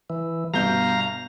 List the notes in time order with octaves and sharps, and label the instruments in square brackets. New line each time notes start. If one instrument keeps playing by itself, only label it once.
[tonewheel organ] E3
[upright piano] G1 B2 G6 [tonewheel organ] F5 A#5